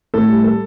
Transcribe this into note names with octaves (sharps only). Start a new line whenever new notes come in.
A2 A4
G3
A4